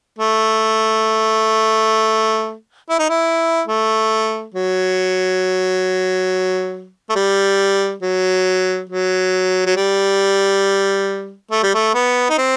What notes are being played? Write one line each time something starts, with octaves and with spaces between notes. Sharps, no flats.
A3
E4
D#4
E4
A3
F#3
A3
G3
F#3
F#3
F#3
G3
A3
G3
A3
B3
D#4
C4